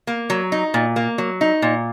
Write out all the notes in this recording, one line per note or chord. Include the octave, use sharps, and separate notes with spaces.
A#3
F#3
D#4
A#2
A#3
F#3
D#4
A#2